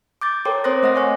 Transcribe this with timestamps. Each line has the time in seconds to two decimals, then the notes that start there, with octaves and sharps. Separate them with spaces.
0.21 D6 G6 A6
0.45 A4 A#4 C#5 G5 C6 D6
0.64 C4 C5 C6 D#6 F#6 A#6
0.83 A3 D#5 F#5 A#6
0.95 C#5 F#5 G#5 C#6 F#6